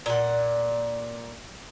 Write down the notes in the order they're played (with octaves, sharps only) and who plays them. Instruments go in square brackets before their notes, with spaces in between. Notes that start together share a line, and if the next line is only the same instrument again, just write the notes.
[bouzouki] A#2 F#5